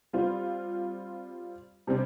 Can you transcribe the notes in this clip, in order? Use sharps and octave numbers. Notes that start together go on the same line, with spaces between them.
G3 C4 F4
C3 G3 C4